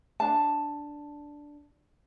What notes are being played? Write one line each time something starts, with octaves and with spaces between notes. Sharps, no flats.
D4 A5